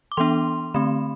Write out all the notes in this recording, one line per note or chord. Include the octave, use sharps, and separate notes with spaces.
D6
E3 B3 D4 C6
D3 A3 C4 B5